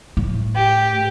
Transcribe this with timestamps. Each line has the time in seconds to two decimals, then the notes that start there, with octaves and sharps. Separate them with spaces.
0.17 A2
0.56 G4